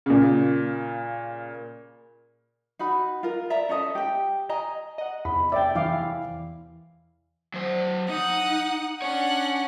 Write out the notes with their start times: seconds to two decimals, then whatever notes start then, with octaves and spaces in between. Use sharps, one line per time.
0.06 A#2 C#3
2.79 D#4 F#4 B5
3.23 F4 A#4
3.50 D5 E5 A#5
3.69 C#4 A4 D#5
3.95 G4 G5
4.49 D#5 G#5 A#5
4.98 D#5 F#5
5.25 E2 C3 B5
5.52 D5 E5 G5
5.75 E3 E4 F5 D6
7.54 F#3 C5
8.09 D#4 F#5 D#6
9.02 C#4 D4 C#5 F#5